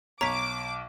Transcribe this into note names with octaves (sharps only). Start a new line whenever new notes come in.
B1 C#5 A#5 D6 B6